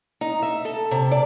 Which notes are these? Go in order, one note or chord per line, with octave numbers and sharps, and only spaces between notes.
D#4
E5
A4
C3
D5